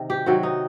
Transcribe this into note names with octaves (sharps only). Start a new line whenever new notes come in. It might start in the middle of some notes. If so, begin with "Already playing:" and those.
Already playing: C3 D#3
G4
C3 D#3 F#3 F#4
D#4